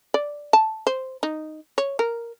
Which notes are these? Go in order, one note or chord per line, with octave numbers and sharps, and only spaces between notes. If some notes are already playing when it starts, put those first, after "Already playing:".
D5
A5
C5
D#4
C#5
A#4